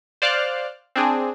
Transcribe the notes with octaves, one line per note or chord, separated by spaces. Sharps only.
C5 D5 F5 F6 F#6
C4 D4 G#4